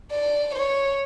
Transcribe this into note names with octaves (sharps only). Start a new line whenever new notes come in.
D5
C#5